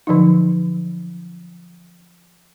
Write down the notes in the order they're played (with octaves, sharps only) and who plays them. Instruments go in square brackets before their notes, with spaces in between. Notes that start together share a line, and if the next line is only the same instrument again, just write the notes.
[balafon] D3 F3 F#3 D#4